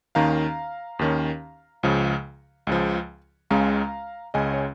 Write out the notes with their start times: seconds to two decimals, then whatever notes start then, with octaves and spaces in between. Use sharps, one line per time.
0.15 D#2 D#3 C#4 F5 A#5
0.99 D#2 D#3 C#4
1.83 C#2 C#3 F3
2.67 C#2 C#3 F3
3.50 C#2 C#3 G#3 C#4 F5 A#5
4.34 C#2 C#3 G#3 C#4 D#5 G#5
4.54 C#5